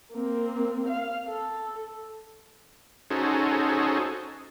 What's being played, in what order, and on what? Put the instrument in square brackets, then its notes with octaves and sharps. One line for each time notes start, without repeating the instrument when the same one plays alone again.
[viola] A#3 C4
F5
A4
[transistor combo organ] C#4 D#4 F#4 G#4 A4 C5